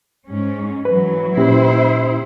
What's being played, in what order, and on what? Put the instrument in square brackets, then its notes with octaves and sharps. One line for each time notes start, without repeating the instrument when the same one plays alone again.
[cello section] G#2 C#4
[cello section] E3 F#3 [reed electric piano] B4
[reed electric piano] A#2 C#4 G4 [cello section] E4 C5